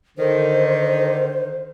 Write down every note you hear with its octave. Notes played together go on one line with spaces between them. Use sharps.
D3 D#3 C5